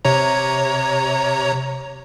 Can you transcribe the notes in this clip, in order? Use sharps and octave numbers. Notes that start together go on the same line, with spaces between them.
C3 C#5 A#5